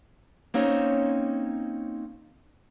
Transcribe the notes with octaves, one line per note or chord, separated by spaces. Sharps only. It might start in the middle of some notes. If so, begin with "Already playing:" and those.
A#3 C4 C#4 D#4 C#5